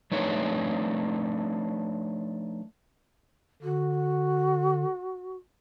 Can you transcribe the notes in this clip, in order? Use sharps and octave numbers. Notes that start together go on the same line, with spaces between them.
F3 A3 D4 D#4 B4 C#5
D3 F#4